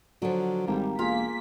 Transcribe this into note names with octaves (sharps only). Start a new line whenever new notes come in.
D3 F3 F#3
G#1 G3 A#3 G4
E1 A#3 F4 G#4 F5 B6